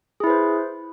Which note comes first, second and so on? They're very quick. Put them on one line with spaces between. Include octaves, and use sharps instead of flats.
G#4 E4 B4 C5